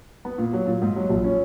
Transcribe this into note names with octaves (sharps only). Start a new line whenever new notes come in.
B3
A#2
F#3
A#2
G#2
F#3
A#1
C#4